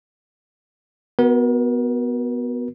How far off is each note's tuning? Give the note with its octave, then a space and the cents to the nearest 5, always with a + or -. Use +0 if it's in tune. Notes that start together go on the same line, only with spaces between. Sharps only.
B3 +0 F#4 +0 A#4 +40